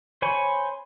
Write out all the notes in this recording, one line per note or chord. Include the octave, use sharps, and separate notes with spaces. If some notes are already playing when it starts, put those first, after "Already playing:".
C5 C#5 G#5 B5 C#6